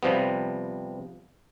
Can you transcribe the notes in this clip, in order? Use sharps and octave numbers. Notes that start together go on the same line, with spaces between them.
C3 F3 G3 B3